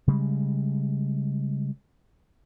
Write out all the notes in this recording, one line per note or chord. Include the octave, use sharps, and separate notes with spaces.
C#3 G3 G#3